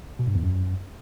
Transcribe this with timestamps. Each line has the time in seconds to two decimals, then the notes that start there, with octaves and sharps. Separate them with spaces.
0.19 B2
0.27 G2
0.35 E2
0.43 F#2